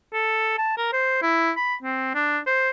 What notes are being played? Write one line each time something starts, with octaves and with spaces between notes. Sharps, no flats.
A4
A5
A#4
C5
E4
B5
C4
D4
C5